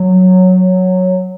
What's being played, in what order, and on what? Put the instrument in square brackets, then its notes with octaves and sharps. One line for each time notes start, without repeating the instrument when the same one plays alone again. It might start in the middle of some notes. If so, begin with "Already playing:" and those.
Already playing: [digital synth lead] F#3